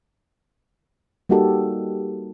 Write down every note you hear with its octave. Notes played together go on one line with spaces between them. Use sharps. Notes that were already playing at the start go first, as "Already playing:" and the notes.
G3 A#3 D#4 F#4 G4 A4